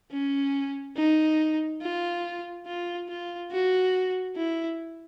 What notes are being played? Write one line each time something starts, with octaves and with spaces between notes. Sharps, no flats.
C#4
D#4
F4
F4
F4
F#4
E4